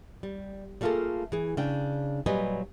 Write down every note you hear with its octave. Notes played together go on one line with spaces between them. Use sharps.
G3
G3 A3 A#3 F4 G#4 A4
E3 G#4
C#3 D4 G5
A#2 F#3 G3 B4 D#5 G#5